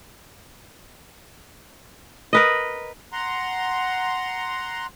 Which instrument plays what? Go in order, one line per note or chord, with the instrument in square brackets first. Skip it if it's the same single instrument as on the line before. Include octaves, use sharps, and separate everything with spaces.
[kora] A#4 B4 D#5
[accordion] F#5 A#5 C6